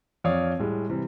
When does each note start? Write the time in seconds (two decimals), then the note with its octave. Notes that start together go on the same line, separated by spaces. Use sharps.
0.24 F2 C#5 D5 F5 D#6
0.59 A2 G3 G#3
0.89 C3 E3 G3 C4